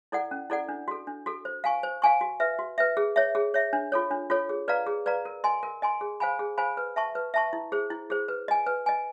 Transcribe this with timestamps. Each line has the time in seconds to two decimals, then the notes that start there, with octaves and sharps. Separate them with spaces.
0.12 E4 A4 D5 F#5
0.31 C#4
0.50 E4 A4 D5 F#5
0.69 D4
0.88 F#4 A4
1.07 D4
1.26 F#4 A4
1.45 C5
1.64 F5 G#5 C#6
1.83 C5
2.02 F5 G#5 C#6
2.21 F#4
2.40 B4 E5
2.59 F#4
2.78 B4 E5
2.97 G#4
3.16 C#5 E5
3.35 G#4
3.54 C#5 E5
3.73 D4
3.92 F4 A4 C#5
4.11 D4
4.30 F4 A4 C#5
4.49 G#4
4.68 B4 D5 F5 A#5
4.87 G#4
5.06 B4 D5 F5 A#5
5.25 A#4
5.44 D#5 G#5 C6
5.63 A#4
5.82 D#5 G#5 C6
6.01 G#4
6.20 C5 F5 G#5 B5
6.39 G#4
6.58 C5 F5 G#5 B5
6.77 B4
6.96 E5 A5 C#6
7.15 B4
7.34 E5 A5 C#6
7.53 E4
7.72 G#4 C5
7.90 E4
8.10 G#4 C5
8.28 B4
8.48 D#5 G#5
8.67 B4
8.86 D#5 G#5